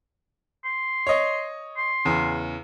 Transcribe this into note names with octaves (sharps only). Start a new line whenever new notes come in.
C6
C#5 D#5
C6
E2 C#3